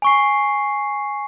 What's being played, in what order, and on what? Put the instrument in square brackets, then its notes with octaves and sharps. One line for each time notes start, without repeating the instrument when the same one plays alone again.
[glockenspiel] G#5 C#6 C7